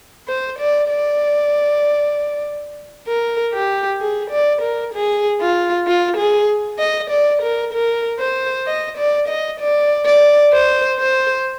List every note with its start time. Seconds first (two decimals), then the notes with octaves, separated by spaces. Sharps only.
0.28 C5
0.59 D5
0.89 D5
3.08 A#4
3.54 G4
4.01 G#4
4.31 D5
4.62 A#4
4.94 G#4
5.41 F4
5.87 F4
6.17 G#4
6.80 D#5
7.11 D5
7.42 A#4
7.73 A#4
8.20 C5
8.67 D#5
8.98 D5
9.29 D#5
9.60 D5
10.06 D5
10.53 C5
11.00 C5